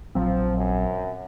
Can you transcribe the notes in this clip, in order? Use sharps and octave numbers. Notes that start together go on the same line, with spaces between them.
A#1 F3 F#3 C4
F#2